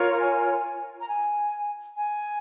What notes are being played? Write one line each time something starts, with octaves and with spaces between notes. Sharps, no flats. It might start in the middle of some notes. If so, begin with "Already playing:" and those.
Already playing: F4 A#4 C#5
A#5
G#5
A#5
G#5
G#5